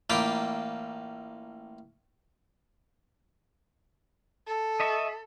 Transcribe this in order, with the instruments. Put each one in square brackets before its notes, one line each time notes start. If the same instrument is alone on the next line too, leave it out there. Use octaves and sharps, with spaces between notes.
[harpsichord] A1 A#3 F4 G5 B5 D6
[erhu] A4
[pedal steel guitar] D#5 E5 C#6